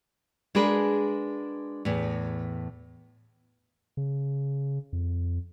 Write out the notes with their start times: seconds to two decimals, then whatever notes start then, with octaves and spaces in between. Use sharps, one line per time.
0.55 G#3 D4 F#4 G#4 A#4 B4
1.85 E2 A2
3.97 C#3
4.93 F2